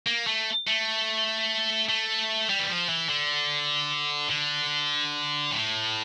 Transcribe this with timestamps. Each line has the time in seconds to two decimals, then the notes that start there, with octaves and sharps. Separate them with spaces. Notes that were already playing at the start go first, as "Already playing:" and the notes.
0.07 A#3
0.27 A3
0.68 A3
1.89 A3
2.49 G3
2.59 E3
2.69 F3
2.89 E3
3.09 D3
4.30 D3
5.51 A2